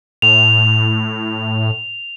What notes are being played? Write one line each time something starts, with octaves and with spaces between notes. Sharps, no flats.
A2 F7